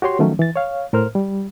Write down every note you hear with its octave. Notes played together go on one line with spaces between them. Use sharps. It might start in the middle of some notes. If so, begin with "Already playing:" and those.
F#4 G4 C#5 C6
D#3 F3 F#3 A3 C#4
E3 A6
C#5 F5
A2 A#4 C5 F6
G3